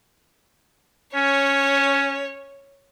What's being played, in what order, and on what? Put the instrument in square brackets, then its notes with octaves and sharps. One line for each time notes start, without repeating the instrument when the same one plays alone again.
[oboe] C#4 [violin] C#5